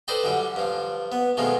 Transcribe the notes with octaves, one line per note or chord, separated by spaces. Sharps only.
A4 B4 C5 D5 D#5 G5
F#2 D3 G3
G2 F3
B3
B2 D#3 F3 G#3 A3